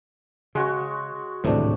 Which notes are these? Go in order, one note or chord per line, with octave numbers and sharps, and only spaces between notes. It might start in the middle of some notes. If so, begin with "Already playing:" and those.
C#3 G#3 F#4 C#6
D1 G#1 E2 A2 C3 D4